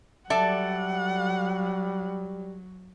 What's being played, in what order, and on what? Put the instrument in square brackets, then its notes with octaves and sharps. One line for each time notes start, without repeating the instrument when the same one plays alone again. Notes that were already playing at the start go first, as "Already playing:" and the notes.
[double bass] F#3 [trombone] G3 [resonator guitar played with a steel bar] A4 D5 E5 [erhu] F#5